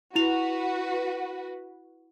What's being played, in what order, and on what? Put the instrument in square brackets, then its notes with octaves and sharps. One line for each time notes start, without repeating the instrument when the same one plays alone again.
[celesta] E4 F7 [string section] F#4 B4